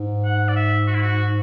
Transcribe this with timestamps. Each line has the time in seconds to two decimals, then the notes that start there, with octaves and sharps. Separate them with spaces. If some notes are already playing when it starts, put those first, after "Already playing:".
Already playing: G#2
0.25 F#5
0.49 D5
0.56 E5
0.88 F#4
0.95 E4
1.02 F#4